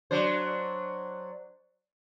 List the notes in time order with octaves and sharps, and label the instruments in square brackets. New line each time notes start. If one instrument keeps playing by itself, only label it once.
[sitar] F#3 D4 C5